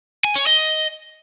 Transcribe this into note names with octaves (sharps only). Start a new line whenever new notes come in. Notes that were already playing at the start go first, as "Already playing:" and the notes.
G#5
C#5
D#5